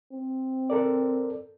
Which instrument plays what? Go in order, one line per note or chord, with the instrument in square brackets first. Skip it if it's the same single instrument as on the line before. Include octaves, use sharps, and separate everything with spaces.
[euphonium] C4
[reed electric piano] A4 A#4 D5